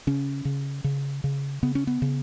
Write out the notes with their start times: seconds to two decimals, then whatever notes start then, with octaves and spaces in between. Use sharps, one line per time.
0.07 C#3 C#4
0.45 C#3
0.84 C#3
1.24 C#3
1.63 C#3 B3
1.75 C#4
1.87 B3
2.02 C#3